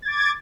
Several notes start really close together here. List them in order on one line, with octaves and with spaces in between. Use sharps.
A6 G#6 D6